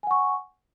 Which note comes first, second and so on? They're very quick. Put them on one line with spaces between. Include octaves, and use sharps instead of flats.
G#5 F#5 C#6